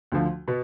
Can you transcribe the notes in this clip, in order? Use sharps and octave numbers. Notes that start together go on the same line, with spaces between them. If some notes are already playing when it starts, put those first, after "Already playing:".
D2 D3 F3
B2 B3